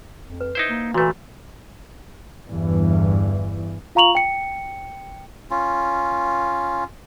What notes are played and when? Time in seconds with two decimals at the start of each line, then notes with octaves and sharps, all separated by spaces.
0.24 F2
0.41 B4
0.55 D#4 E4 C5
0.69 A#3
0.94 A#2 E3 A3 F#4 B4
2.49 G1 E2 G2 E3
3.95 F4 F5 A#5 C#6 F7 F#7
4.15 G5 C#7
5.51 C#4 F4